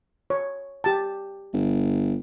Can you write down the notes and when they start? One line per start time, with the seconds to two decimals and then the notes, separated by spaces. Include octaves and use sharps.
0.30 C#5
0.84 G4 A5
1.53 G1